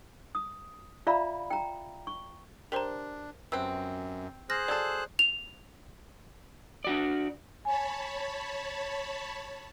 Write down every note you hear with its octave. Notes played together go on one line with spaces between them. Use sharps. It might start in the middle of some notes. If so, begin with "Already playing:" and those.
D#6
F4 D5 E5 F5 A#5 B5
G5 A#5
C#6
D4 G4 A#4 C5 A#5 C6
F#2 C3 B3 C4 E6
G#4 C5 F6 F#6 A#6
F#3 A4 D5 E6
F7
D4 F#4 D5
C#5 G#5 A5 B5